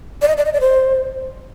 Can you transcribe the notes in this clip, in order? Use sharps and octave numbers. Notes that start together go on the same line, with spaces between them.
D5
D#5
D5
D#5
D5
C5